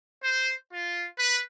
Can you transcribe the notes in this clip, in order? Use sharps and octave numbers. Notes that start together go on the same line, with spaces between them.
C5
F4
B4